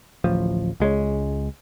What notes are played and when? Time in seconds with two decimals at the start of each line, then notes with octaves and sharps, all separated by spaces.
0.24 D1 A1 F3
0.80 C#2 G#3 A#3 C#4